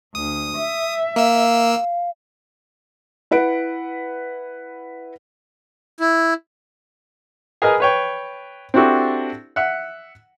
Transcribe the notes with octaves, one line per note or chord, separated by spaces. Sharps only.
D2 D#6
E5
A#3 F5 E6
E4 B4 F#5 D7
E4
G#4 A#4 B4 D#5 F6
B4 C#5 G5
C4 D4 E4 F#4 G4 A4
E5 F#5